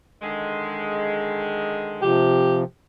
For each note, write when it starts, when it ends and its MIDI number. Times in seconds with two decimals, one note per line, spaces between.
0.22 2.19 50
0.22 2.19 51
0.22 2.19 56
2.02 2.64 48
2.02 2.64 53
2.02 2.59 67